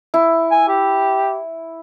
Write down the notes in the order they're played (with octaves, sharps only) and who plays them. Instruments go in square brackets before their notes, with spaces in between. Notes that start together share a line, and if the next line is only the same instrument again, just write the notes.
[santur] E4
[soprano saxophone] G#5
G4